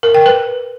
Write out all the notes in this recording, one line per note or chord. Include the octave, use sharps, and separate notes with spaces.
A#4
G5
B4